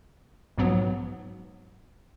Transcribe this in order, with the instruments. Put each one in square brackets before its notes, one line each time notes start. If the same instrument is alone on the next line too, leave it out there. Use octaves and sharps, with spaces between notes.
[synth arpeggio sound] B1 G#2 F3 F#3 B3